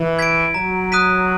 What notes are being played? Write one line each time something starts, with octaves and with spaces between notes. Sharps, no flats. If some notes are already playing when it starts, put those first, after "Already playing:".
Already playing: E3
G#6 B6 D7
F#3 A#5
D#6 F#6 B6 D#7